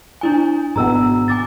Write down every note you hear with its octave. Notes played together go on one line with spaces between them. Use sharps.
D4 E4 G#5
G#1 B2 B3 A#5 E6
G#5 D6 A6